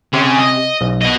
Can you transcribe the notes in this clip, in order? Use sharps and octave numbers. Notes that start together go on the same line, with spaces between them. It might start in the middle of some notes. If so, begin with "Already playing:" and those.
C3 C#4 G#4
D#5
B1
B3 D#5